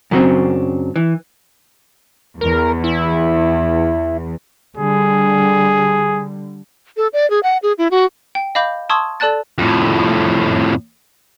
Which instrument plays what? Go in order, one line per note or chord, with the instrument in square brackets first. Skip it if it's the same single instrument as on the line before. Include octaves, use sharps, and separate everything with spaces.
[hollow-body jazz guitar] F#2 C#3 F#3 G3 C4 D4
E3
[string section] E2 [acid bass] A#4
[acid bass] E4
[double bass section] D3 G3 [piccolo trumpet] G#4
[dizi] A4
D5
G#4
F#5
G#4
E4
F#4
[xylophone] G5
D#5 F5 B5 D6 G6
A5 C6 C#6 D#6 E6 G#6
A4 D5 A5 F#6 A6
[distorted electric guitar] F2 A2